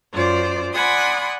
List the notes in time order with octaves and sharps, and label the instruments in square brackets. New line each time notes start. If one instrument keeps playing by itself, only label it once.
[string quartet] F#2 F4 C5 D5
D5 F#5 G#5 B5 C6 D#6